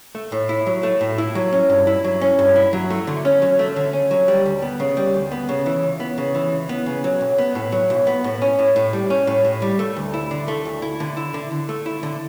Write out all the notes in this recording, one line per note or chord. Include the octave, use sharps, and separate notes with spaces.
A3
A2
E4
F#3
A3
A2
E4
F#3
C#4
G2
E4
F#3
C#4
G2
E4
F#3
A3
D3
C#4
F#3
A3
D3
C#4
F#3
G3
D2
B3
C#3
G3
D2
B3
C#3
E3
C#2
B3
C#3
E3
C#2
B3
C#3
F#3
B1
B3
A2
F#3
B1
B3
A2
C#4
A2
A2
G3
C#4
A2
A2
G3
A3
D2
E4
D3
A3
D2
E4
D3
E4
D3
D3
A3
E4
D3